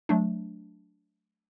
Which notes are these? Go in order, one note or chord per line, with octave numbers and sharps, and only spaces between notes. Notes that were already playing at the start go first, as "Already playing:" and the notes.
F#3 A3 D4